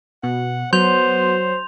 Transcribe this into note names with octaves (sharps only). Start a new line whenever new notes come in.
B2 F#5
F#3 B3 C5 C6 G6 F7